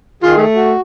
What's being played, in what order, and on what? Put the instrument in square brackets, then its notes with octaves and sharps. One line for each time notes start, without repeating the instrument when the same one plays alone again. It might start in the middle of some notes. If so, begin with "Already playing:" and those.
[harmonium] D#3 G#4 [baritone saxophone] F4
[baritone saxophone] A3
[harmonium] F#4